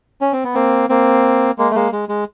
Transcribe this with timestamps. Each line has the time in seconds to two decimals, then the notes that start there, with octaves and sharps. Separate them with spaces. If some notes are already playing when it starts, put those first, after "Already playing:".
0.21 C#4
0.33 C4
0.44 B3
0.55 A#3 C4
0.89 A#3 C4
1.58 G#3 A#3
1.71 A3
1.75 G#3 A#3
1.92 G#3
2.09 G#3